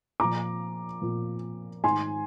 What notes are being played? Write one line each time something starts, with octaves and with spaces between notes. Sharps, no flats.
A#2 F3 A#5 D6
A#2 F3
G#2 D#3 G#5 C6